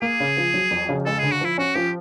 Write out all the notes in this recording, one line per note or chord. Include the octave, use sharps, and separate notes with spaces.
A#3 G#4
C#3
F3
F#3
F2
C#3
G#3 A4
D3 G#4
F#4
F3 E4
C#4 F#4
F3 G4